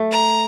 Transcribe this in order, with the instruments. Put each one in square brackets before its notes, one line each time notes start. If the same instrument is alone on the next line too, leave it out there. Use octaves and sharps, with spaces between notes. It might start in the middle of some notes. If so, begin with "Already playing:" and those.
Already playing: [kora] A3
[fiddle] A#5